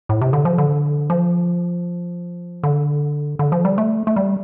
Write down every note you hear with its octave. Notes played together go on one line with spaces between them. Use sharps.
A2
C3
D3
F3
D3
F3
D3
D3
F3
G3
A3
A3
G3